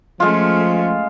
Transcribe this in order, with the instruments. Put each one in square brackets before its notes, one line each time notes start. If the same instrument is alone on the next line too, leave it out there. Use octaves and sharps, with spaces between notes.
[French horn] F3 [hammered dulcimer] G#3 F4 [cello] A3 C#4